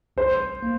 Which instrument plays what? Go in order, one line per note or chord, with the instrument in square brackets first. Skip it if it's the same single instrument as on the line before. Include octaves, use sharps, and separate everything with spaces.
[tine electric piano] C2 [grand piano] C5
[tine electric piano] A#3